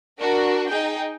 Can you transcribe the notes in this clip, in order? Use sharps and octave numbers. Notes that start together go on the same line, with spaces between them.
D4 F#4 A#4
D#4 G#4 G5